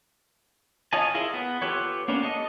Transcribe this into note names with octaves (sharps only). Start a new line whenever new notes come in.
F4 C#5 D#5 G#5 A5
E4 F4 G#4 A#4
B3
F4 G4 A4 B4 C#5
A#3 B3 C#4 D4
A4 D#5